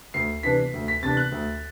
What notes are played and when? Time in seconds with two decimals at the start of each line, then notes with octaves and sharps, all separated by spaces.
0.14 D2 C7
0.43 C3 E3 B3 D4 B6
0.73 D2
0.88 B6
1.02 C3 E3 B3 D4 A6
1.17 F#6
1.32 D2